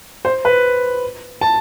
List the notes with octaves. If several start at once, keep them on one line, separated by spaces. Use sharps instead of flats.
C5
B4
A5